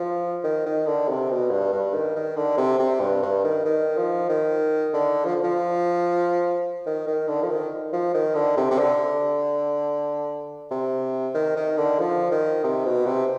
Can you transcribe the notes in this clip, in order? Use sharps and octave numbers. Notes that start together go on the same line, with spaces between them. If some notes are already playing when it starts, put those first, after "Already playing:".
Already playing: F3
D#3
D#3
D3
C3
B2
G2
G2
D#3
D#3
D3
C3
C3
G2
G2
D#3
D#3
F3
D#3
D3
F3
F3
D#3
D#3
D3
F3
D#3
F3
D#3
D3
C3
C3
D3
C3
D#3
D#3
D3
F3
D#3
C3
B2
C3